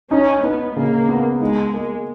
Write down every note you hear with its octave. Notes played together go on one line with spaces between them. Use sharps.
C#4 D#4
B3 D#4
C#3 A#3
B3
G#3 D#4
A#3